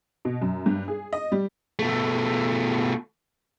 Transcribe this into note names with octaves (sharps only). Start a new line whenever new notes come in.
B2
F#2
G2
G#4
D#5
G3
B2 A3